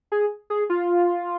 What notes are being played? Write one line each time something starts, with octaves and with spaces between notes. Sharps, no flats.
G#4
G#4
F4